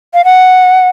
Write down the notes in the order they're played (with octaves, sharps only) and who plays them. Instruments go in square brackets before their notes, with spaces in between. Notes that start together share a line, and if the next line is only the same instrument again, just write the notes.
[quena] F5
F#5